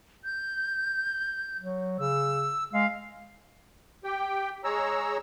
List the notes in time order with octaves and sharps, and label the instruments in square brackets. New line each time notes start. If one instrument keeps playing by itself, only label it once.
[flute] G6
[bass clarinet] F#3
[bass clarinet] C#3 [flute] E6
[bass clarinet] G#3 [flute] F5
[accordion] G4 G5
G#3 G#4 C#5 A#5 E6